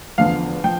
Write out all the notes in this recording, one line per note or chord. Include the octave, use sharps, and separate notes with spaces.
E2 D3 F3 F5
F3 G5